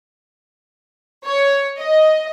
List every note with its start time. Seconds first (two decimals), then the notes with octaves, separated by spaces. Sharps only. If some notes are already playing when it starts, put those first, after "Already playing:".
1.24 C#5
1.78 D#5